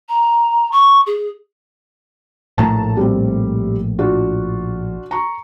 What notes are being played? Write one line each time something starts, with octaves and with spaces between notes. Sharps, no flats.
A#5
C#6
G#4
A#1 A2 A3 A5 A#5
G3 C4
D4 F4 F#4
A#5 C#6